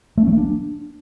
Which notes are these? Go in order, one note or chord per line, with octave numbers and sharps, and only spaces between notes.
A3
C#4
F#3
A#3
D4